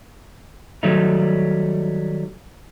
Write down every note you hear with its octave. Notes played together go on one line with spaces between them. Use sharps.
D#3 F#3 G3 A3 D#4